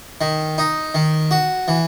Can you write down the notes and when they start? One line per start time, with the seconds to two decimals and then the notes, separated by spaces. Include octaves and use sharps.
0.21 D#3
0.58 D#4
0.94 D#3
1.31 F#4
1.68 E3